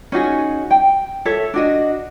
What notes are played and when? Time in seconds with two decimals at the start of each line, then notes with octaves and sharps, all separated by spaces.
0.12 C#4 D#4 F#4 G#4
0.71 G5
1.25 A4 C#5 E5
1.54 D4 F#4 D#5